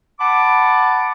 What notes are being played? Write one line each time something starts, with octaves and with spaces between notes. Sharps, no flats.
F#5 A5 B5 D6